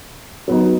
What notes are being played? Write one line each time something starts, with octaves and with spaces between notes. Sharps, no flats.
F#3 B3 D#4